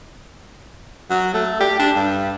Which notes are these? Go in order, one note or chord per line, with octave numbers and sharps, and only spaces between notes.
F#3
A3
G4
D4
G2